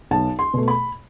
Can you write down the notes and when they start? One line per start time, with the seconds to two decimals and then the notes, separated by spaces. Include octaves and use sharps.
0.11 B1 A5
0.39 C6
0.54 B2 A3
0.68 B5